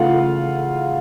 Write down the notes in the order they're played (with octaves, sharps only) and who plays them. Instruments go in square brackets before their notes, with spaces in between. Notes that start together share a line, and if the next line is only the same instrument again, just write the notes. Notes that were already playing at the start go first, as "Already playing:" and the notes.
Already playing: [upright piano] C#3 E3 A3 F4 F5 F#5